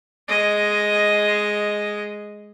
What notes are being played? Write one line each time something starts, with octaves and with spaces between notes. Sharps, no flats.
G#3 D#5